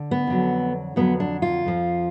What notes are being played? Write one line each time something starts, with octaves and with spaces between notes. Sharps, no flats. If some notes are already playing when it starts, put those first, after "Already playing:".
Already playing: D3
B3
F2 D3 F#3
F2 D3 F#3 B3
D4
F4
F2 F3